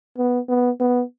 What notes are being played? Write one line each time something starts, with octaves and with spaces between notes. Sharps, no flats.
B3
B3
B3